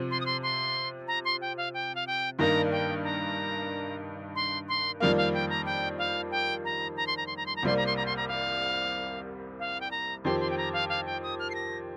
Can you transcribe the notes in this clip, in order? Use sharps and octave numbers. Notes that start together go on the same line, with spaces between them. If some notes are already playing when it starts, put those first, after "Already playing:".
Already playing: C3 F3 C4
C6
D#6
C6
C6
A#5
C6
G5
F5
G5
F5
G5
G2 D#3 A#3 D#4 A#5
G5
A#5
C6
C6
F2 D#3 G3 A#3 F5
F5
G5
A#5
G5
F5
G5
A#5
A#5
C6
A#5
C6
A#5
C6
A#5
C2 C3 G3 A#3 C6
A#5
C6
A#5
C6
A#5
F5
F5
G5
A#5
F2 D#3 C4 G4 C6
C6
G5
A#5
F5
F5
G5
D#6
F6
C7
A#6